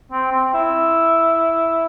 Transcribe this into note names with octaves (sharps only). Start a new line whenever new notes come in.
C4
C4
E4